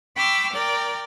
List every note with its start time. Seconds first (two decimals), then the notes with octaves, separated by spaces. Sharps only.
0.16 G5 B5 C#6 D6 E6 F6
0.52 A#4 D5 G5